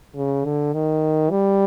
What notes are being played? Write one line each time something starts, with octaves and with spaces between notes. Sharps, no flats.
C#3
D3
D#3
G3